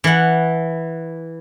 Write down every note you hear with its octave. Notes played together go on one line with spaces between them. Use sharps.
E3 F#5